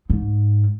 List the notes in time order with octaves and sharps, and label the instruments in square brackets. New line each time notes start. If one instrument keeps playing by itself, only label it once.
[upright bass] G#2